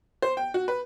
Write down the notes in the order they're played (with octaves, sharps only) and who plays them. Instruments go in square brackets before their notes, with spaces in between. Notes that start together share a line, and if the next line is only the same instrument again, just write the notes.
[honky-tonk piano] C5
G5
F#4
B4